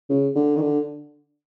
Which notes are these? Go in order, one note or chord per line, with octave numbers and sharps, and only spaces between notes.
C#3
D3
D#3
D3